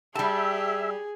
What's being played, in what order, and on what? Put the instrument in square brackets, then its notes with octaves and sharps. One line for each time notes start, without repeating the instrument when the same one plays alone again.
[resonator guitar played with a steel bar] G3 A5 [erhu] G4 [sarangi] G#4 [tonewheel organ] E5